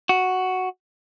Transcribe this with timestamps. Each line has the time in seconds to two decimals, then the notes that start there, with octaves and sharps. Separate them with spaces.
0.09 F#4